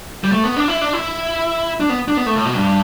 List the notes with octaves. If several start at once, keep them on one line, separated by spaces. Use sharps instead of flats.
G3
A3
B3
D4
E4
D4
E4
D4
B3
D4
B3
A3
A2
B2
G2